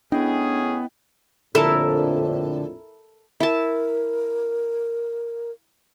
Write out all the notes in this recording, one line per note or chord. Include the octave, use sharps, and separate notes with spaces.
A2 B3 C#4 D4 E4 G#4 D#5 G5
A#1 F2 A2 D3 E4 A4 A#4 A5
E4 A#4 A5